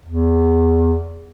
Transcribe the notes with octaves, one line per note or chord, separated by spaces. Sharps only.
E2